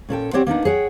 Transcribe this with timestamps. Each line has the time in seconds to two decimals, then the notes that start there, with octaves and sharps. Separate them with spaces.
0.09 A#2 C#4 A4 G5
0.33 C4 G4 C#5 D5 F#5
0.46 A#3 B3 D4 D#4
0.65 G#4 C#5 F#5 G5